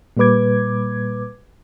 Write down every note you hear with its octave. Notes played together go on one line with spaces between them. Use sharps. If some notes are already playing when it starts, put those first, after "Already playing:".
A#2 G3 A#3 B4 D6 G#6